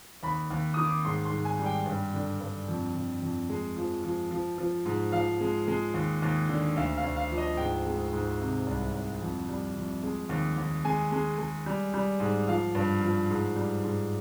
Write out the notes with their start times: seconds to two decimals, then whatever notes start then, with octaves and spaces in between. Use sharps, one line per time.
0.23 D#2 B5
0.50 D#2
0.74 D#3 D#6
0.84 D6
1.05 G#2 C6
1.25 C6
1.31 G#2
1.45 G#5
1.59 G3
1.66 G5
1.86 G2
2.14 D3
2.40 G2
2.68 F2
2.95 F2
3.22 F2
3.49 G#3
3.76 F3
4.04 F3
4.31 F3
4.58 F3
4.85 G#2
5.12 F3 F5
5.40 G#3
5.68 G#3
5.94 D#2
6.22 D#2
6.49 D3
6.76 D2 F5
6.97 F5
7.03 D2
7.16 F5
7.30 F3
7.38 D#5
7.57 G#2 G5
7.86 G#3
8.12 G#2
8.40 C3
8.66 C2
8.93 C2
9.21 F2
9.49 G3
9.76 F2
10.03 G#3
10.29 D#2
10.58 D#2
10.85 G#3 G#5
11.12 G#3
11.38 G#3
11.66 G3
11.94 G3
12.20 G#2
12.48 F3 F5
12.75 G2
13.01 F3
13.30 G#2
13.56 G3
13.84 G#2